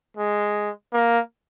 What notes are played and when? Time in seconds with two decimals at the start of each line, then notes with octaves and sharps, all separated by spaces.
0.17 G#3
0.93 A#3